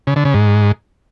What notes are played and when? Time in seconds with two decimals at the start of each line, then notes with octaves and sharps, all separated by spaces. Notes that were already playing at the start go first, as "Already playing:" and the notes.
0.07 C#3
0.16 D3
0.25 C#3
0.34 G#2